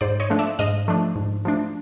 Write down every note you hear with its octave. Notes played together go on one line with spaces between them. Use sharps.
G#2 C5 D5
C#5 D#5
F3 A3 D4
D5 E5
G#2 D#5 F5
F3 A3 D4
G#2
F3 A3 D4